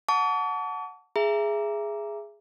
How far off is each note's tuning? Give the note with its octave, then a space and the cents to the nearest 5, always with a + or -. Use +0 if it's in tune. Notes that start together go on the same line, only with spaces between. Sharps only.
F#5 -10 A5 +0 C#6 +45
G#4 +0 E5 +25 A#5 +5